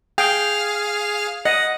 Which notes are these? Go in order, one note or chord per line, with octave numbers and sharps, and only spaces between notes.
G#4 F5 G5 F6
D#5 F#5